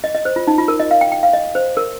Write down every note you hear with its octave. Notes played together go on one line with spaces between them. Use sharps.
D#5
D#5
C5
F4
D#4
F4
A#4
D#5
F5
G5
G5
F5
D#5
C5
A#4